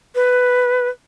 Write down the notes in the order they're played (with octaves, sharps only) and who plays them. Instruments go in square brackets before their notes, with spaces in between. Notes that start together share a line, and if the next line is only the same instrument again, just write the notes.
[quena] B4